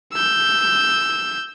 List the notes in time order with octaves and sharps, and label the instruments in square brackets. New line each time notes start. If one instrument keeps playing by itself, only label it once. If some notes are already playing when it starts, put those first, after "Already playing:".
[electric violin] E6 G6